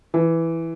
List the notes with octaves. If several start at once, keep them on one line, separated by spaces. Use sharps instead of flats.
E3